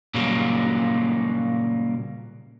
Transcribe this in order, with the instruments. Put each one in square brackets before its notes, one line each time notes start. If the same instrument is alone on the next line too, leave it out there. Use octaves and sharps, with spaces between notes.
[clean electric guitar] A#2 C#3 F#3 G3 A#3